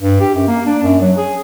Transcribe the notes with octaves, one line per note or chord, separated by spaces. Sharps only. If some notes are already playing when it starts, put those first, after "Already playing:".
G2
G4
F#2
A#3
D4
F#2
F#3
G#4